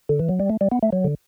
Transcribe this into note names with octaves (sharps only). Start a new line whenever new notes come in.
D3
E3
F#3
G3
A3
G3
B3
A3
F#3
D3